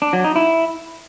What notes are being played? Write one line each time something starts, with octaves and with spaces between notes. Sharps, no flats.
D4
F#3
D#4
E4